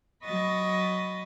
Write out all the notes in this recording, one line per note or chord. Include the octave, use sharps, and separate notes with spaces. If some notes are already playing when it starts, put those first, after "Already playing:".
F#3 D#5 B5 C#6 D#6 A6